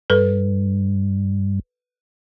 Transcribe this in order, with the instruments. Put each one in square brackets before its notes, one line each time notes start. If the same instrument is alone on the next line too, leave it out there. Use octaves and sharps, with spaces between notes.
[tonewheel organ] G2 [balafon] A4 B4